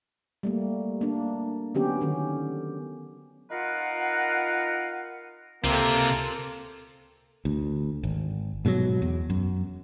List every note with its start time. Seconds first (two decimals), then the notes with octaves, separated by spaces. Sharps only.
0.43 G3 A3 A#3
1.01 A#3 D4
1.75 D3 F#3 B3 C#4 G4
2.01 D3 D#3 C#4
3.50 D#4 F4 A#4 B4 F5 F#5
5.64 C#2 C3 A#3 C4 F4 A4
7.45 D2
8.03 G#1
8.65 G#2 B2 E3 F#3
9.02 E2
9.30 F#2